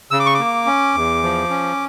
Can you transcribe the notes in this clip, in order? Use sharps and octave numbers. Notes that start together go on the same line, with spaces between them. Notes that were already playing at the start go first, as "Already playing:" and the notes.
C#3 E6
D6
C#6
A#3 D6
C#4
E2
F3
C#4